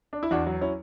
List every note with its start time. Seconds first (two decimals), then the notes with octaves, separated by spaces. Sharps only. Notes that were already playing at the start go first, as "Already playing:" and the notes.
0.13 D4
0.23 E4
0.31 E2 D4 F#4
0.47 F#3
0.61 C#4 E4